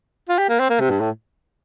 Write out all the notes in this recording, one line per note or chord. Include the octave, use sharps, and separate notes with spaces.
F4
G4
A#3
C4
A#3
C3
G2
A2